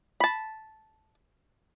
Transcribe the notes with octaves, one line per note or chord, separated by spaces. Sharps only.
A5 B5